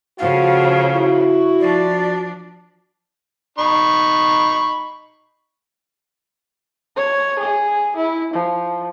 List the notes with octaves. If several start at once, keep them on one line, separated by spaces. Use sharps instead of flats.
C#3 F3 A3 F#4 F5
E4 F#4
F3 D4 D5
D#4 B5 C#6
C#5
G#4
E4
F3